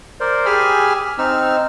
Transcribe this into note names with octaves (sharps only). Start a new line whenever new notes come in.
A#4 C5 D5
G4 G#4 G#5 B5 E6 F6
C4 D#4 E6 F6